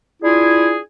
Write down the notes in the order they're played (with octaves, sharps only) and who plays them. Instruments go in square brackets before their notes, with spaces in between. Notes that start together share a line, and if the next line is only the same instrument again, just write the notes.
[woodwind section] D4 E4 F4 G#4